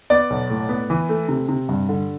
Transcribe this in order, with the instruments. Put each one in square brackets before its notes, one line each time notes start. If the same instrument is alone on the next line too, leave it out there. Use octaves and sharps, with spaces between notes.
[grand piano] B3 D5
B1
A2
B3
E3
A3
C3
C3
G2
D3